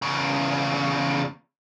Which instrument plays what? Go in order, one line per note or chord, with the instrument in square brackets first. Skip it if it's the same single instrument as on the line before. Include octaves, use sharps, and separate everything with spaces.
[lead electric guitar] E2 C#3